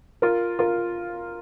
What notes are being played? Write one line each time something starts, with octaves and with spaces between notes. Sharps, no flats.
F4 A#4
F4 A#4